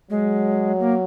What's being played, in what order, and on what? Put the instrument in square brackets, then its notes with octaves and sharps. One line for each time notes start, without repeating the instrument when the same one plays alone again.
[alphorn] F#3 [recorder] G#3
[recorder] A#3